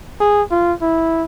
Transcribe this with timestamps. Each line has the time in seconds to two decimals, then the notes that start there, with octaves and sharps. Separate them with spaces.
0.20 G#4
0.51 F4
0.82 E4